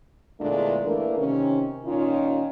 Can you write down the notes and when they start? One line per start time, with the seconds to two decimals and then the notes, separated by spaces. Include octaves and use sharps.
0.41 E2 A#2 D3 G#3 A3 D4
0.85 E3 A3 A#3 D4 A#4
1.18 C3 D#3 C#4
1.86 A#2 D#3 C#4 D#4 F4